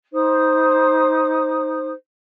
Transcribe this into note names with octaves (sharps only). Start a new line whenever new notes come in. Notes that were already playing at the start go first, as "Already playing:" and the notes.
D#4 C5 D#6